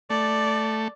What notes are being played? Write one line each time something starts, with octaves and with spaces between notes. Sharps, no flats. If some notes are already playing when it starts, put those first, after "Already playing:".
A3 D5